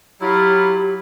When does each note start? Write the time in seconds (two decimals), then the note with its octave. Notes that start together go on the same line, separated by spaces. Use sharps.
0.21 F#3 E4 F4 G4